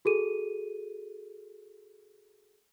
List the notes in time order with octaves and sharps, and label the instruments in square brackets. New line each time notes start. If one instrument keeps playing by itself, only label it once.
[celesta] F#4 G#4 A4 D#7